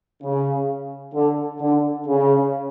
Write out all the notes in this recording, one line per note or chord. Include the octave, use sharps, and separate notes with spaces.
C#3
D3
D3
C#3